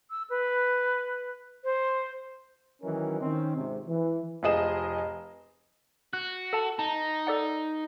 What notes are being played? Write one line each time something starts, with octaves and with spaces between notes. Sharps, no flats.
E6
B4
C5
D#3 E3 F#3 C#4 D#4 A#4
D#3 C4 C#4
G#1 C3
E3
F1 F3 G#4 D#5 E7
F#4 F#6
A4 F#5 A5
D#4 A5
A4 D5 F#5